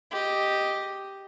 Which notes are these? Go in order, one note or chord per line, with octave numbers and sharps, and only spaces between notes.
G4 D#5